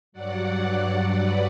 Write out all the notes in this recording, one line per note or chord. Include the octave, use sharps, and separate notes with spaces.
G2 F#3 D5 F#5
B4 D5